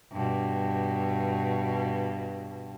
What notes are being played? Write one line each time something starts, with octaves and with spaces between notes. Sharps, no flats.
G2 B2